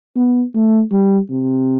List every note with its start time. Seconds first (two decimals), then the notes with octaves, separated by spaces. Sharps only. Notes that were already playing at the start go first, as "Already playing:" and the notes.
0.16 B3
0.55 A3
0.92 G3
1.30 C3